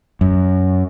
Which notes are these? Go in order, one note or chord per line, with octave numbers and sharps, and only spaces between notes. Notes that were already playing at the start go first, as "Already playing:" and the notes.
F#2